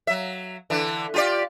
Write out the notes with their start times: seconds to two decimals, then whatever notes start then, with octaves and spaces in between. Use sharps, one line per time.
0.07 F#3 E5
0.70 D3 E3
1.14 F4 G4 D5